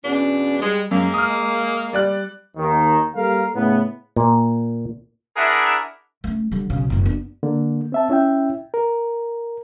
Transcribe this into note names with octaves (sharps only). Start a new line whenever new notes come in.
E2 B2 C#4 D4
G3 G#3
F#2 G#3 A#3
D#6 F6
G3 D5 F#6
D#2 D#3
G3 A#3 G4 A4 A#4 F5
A2 C#3 B3
A#2
D4 E4 G#4 A#4 E5 F#5
A3 C#4
D3 G3
B1 C#3
F#1 A2
B3 D4
D3 A#3
C4 E5 A5
C#4 E4 E5 G5
A#4